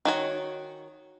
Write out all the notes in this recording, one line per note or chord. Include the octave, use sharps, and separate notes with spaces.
D#3 F#4 C#5